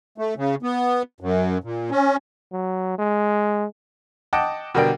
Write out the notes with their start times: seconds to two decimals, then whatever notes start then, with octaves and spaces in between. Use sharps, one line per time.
0.18 A3
0.37 C#3
0.63 B3
1.21 F#2
1.64 A#2
1.91 C#4
2.52 F#3
2.98 G#3
4.33 D#5 F#5 G5 A5 D6
4.75 B2 D3 G3 A#4 D5 G5